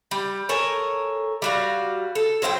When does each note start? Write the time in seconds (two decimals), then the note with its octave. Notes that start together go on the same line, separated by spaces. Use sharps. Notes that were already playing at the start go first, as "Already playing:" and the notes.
0.11 G3
0.49 A4 A#4 C#5 G#5
1.42 G3 F#4 F5
2.15 A4
2.42 F#3 C5 E5 G5